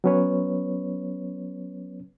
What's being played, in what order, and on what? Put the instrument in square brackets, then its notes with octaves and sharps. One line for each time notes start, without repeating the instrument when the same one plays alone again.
[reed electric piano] F#3 B3 C#4 B4 C#5